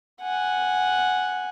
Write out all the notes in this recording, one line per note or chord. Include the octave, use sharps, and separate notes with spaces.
F#5 G#5